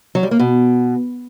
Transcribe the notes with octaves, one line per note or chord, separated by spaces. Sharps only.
F#3
G3
A#3
B2